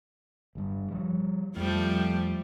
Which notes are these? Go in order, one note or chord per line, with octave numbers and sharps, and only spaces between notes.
G1 G2
F3 G3
F2 F3 G3 A3